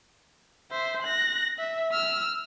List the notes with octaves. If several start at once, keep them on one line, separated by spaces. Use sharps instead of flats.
C5 E5
F#6 A#6
E5
E6 F6